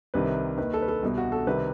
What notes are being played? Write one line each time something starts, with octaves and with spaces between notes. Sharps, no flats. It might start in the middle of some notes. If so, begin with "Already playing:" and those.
C2 C3 D#3 B4
D#2 D#3 B4
A4
B4
A4
C2 B2
F#4
A4
C2 C3 D#3 B4